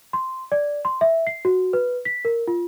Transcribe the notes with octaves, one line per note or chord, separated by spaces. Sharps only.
C6
D5
C6
E5
C7
F#4
B4
B6
A#4
F4